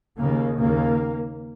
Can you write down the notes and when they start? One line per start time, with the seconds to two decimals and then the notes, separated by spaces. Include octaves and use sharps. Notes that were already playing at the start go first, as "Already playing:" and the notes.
0.19 D#2 C#3 A#3
0.58 D#2 C#3 A#3